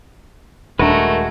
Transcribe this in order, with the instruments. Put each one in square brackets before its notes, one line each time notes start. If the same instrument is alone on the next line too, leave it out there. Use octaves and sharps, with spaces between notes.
[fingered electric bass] D#1 D4 [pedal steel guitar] G#3 F#4 [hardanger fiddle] A3 [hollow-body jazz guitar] A#4 B4